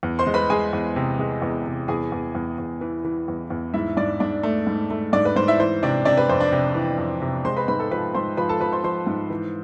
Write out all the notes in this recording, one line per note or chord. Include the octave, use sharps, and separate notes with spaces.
E2
C5 C6
G#3
B4 B5
G#3 G#4 G#5
E2
C3
G#3
E2
C3
E2 G#4 G#5
E2
E2
E2
E3
E3
E2
E2
G#2 E4 E5
G#2 D4 D5
G#2 D4 D5
A3
G#2
A3
G#2 D4 D5
B4
G#2 C5
E4 E5
E3 C5
C3 D4 D5
C3 D4 D5
B4
F2 C5
D4 D5
C3
E3
F2
C3
G#3 C5 C6
B4 B5
G#2 B4 B5
A4 A5
F3 B4 B5
G#2 C5 C6
F3 B4 B5
A4 A5
F3 B4 B5
C5 C6
F3 C5 C6
G#2
E3